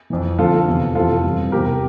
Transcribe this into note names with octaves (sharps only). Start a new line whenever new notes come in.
F2 E3
F2 D3 F3 F4 A4
E2 C3 E3
F2 C3 E3 F4 A4
G2 E3
E2 C3 E3 G4 A#4